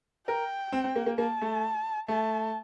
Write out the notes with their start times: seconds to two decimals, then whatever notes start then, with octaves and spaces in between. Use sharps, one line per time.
0.28 A#4 G5
0.72 C4
0.84 C4
0.96 A#3
1.06 A#3
1.18 A#3 A5
1.42 A3
2.08 A3 A5